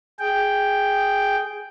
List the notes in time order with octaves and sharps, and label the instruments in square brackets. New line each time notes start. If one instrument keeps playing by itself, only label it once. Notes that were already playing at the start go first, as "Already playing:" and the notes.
[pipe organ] G#4 G5